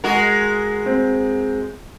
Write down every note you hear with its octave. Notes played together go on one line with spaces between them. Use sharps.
G#3 F#4 A#4
C4